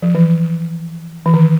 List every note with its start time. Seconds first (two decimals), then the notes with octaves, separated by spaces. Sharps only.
0.02 F3
0.15 E3
1.26 E3
1.34 D#3